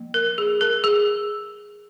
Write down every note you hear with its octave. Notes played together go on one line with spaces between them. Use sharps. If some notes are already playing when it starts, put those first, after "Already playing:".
Already playing: F3 A#3
A#4
G#4
A#4
G#4